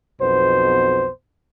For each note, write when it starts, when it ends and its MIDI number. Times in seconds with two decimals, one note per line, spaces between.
0.20 1.08 35
0.20 1.08 41
0.20 1.08 47
0.20 1.08 59
0.20 1.08 72